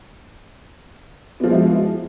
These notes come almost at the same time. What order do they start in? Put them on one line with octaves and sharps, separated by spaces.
B3 F3 G#3 E4 F#4